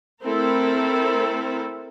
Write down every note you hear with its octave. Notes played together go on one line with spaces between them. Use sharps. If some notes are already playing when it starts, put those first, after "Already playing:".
A3 C4 E4 A4 A#4